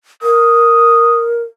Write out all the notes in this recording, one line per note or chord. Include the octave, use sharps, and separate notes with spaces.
A#4 D#6